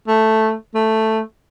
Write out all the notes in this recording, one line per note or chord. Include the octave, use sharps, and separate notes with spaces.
A3
A3